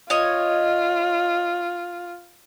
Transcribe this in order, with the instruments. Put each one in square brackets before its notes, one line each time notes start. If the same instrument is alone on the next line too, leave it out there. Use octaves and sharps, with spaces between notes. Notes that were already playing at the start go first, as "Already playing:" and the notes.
[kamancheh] F4 [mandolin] C#5 D#5